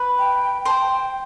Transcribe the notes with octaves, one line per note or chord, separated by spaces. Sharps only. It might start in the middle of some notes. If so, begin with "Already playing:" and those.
Already playing: B4
G5
C5 A5
G5